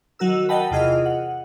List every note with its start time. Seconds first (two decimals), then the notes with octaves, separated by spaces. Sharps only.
0.19 D#3 F#3 F#4 A#4 E6
0.49 A#4 D#5 F#5 G5 A5 B5
0.71 E2 C3 F4 G#4 D#5 F6
1.06 F#5